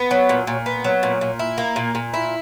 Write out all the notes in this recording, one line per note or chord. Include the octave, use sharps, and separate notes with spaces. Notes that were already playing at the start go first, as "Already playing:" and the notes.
Already playing: B3
F#3
A#2
A#2
B3
F#3
A#2
A#2
E4
A#3
A#2
A#2
E4